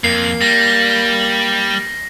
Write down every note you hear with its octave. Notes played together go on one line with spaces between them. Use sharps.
F2 A#3 C7
G3 A#6